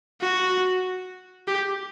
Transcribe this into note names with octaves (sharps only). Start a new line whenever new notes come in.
F#4
G4